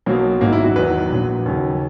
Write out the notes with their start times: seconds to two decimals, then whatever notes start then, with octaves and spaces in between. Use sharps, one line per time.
0.06 B1 B2 F#3 A#3
0.41 G#1 G#2 F#3 A#3
0.53 E4
0.64 F#4
0.76 E2 D#3 F#3 B4
1.10 A#1 A#2 F#3
1.46 D#2 C#3 F#3